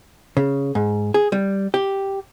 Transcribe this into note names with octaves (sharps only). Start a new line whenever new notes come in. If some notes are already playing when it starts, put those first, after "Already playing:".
C#3
G#2
G#4
G3
G4